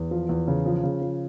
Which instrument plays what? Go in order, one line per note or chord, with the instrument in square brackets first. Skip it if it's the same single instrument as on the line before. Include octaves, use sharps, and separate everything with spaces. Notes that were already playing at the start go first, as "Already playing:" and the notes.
Already playing: [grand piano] E2
F3
E2
C#3
F3
C#3
F3